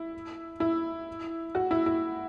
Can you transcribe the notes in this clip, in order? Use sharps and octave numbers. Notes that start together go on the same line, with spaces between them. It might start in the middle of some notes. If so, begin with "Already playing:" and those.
Already playing: E4
E4
F#4
E4
E4